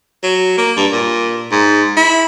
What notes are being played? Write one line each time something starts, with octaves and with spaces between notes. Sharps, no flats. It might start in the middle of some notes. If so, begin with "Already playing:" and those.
F#3
A#3
G2
A#2
G#2
E4